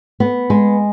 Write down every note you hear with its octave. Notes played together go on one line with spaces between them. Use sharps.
B3
G#3